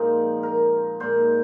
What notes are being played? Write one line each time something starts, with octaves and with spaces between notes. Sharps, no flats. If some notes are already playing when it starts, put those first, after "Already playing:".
Already playing: A#2 F3 G#3 C4 D#4 C5
A#4
A#2 G#3 D#4 C5